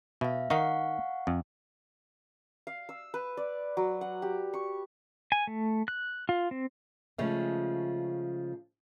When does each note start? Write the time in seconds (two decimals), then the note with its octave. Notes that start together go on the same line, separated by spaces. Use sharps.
0.21 B2 E5 F5
0.50 D#3 D#4 F5 F#5 C#6
1.27 F2
2.67 F5
2.89 E6
3.14 B4
3.37 D5
3.77 F#3
4.01 F#5
4.22 G4
4.54 C#6
5.32 G#5
5.47 A3
5.88 F#6
6.29 F4
6.51 C4
7.18 C#3 F3 G#3 A3 C#4